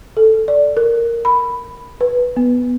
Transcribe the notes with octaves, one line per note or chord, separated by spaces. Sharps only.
A4
D5
A#4
B5
B4
B3